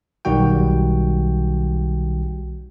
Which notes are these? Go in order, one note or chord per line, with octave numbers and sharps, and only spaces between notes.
B1 D#3 G3 F#4 G5